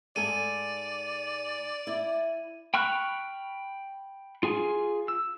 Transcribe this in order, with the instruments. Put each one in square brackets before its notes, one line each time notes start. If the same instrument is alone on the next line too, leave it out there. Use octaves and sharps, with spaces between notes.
[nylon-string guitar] G#2 A4 G#5 [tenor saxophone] D5 [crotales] D#7
[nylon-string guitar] E4
[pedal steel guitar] G5 B5 C#6 F6 F#6
F4 G#4 G#5
E6